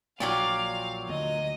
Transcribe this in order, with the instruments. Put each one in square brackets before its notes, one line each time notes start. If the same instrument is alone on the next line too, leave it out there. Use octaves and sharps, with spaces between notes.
[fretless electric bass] A#1 [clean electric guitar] A#2 F#3 [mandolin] F4 G4 D5 [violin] F5
[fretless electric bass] D2 [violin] D#5